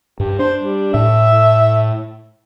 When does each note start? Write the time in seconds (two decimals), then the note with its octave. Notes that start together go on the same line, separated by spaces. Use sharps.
0.20 G2 G4
0.39 D4 C5
0.61 G3
0.94 A2 E5